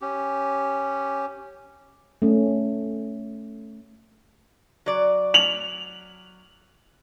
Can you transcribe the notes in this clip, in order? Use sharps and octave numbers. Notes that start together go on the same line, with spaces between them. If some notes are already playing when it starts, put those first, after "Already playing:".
C#4 G4
A3 C#4
F#3 D5
F7 F#7